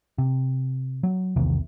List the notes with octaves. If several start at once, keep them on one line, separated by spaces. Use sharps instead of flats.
C3
F#3
B1 E2 C3 D#3